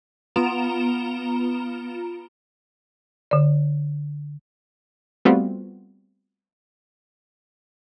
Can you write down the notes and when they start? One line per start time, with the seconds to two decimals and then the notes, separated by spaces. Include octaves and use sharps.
0.36 B3 F4 A#5 D7 E7 F7
3.31 D3 D5
5.25 G3 A3 B3 C4 F4 F#4